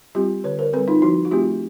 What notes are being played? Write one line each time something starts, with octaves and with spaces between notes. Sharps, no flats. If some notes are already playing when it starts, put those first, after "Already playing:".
G3 C4 F4 G4
D3 B4 C#5
A#4 C5
G3 C4 A4 B4
D#4 F4
F3 E4 F#4
F#4
A3 C4 F4 G4